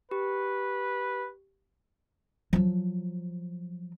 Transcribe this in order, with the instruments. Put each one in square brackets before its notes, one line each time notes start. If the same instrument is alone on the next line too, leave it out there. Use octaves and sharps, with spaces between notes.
[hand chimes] G4 [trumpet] B4
[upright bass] F3 F#3